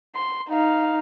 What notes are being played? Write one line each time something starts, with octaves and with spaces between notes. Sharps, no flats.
C6
D#4 F5